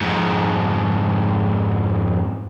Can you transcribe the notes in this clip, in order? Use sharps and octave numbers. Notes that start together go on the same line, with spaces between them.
F2 G#2